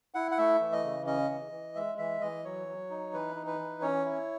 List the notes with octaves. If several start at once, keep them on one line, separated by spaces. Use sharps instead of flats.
E4 F#5
F#5
A3 E5
E3
D#5
C#3
C#4 D#5
E3
E3
G#3 E5
E3 E5
E3 D#5
F#3 C#5
F#3
D#4
E3 B4
D#4
B4
E3
C#4 C#5
E4